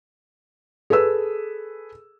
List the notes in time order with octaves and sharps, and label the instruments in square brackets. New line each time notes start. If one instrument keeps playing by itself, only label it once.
[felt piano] G#4 A4 B4 E6